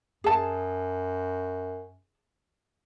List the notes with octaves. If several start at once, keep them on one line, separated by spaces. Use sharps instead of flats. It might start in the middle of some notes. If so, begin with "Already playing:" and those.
F#2 G#4 A5